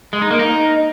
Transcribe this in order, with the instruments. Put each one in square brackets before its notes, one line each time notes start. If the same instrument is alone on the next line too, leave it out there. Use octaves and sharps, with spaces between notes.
[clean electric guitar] G#3
D#4
A#3
D#4